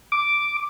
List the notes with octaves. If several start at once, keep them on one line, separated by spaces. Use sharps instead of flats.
D6